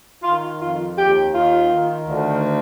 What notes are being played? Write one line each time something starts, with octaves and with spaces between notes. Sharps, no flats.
D#3 F4
F2 F4
D#2 G4
D#3 F4
D#3
D2